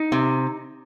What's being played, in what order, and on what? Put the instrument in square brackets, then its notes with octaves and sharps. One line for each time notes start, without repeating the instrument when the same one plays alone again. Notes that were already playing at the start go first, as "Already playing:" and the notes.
Already playing: [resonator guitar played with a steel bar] D#4
C3